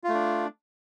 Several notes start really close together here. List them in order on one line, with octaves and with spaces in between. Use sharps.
F4 A3 D4